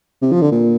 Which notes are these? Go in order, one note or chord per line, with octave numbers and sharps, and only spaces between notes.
C3
F3
D3
A#2